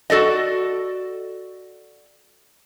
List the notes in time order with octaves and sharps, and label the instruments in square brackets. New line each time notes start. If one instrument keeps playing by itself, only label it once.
[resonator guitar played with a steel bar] F#4 A4 D5 D#5